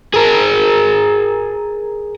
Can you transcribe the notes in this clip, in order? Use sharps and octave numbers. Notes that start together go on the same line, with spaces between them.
G#4 A#4